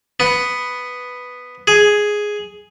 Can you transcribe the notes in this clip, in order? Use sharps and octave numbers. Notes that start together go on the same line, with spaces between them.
B3
G#4